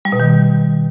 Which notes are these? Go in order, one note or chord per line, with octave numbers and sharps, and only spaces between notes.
G3
B2
D#3